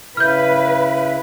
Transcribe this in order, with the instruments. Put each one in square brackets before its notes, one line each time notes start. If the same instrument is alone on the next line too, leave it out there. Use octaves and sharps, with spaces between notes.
[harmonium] C#3 E4 [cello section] B4 [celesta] F6 G6